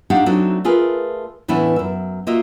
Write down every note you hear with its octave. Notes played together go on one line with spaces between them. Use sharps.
A3 D4 D#4 G4 F5 F#5
F#3 A3 C4 D4 D#4 F#4
A3 F4 G#4 A#4 B4
A2 E3 B3 C#4 D4 E4
F#2 E5
A#3 F4 F#4 D#5 E5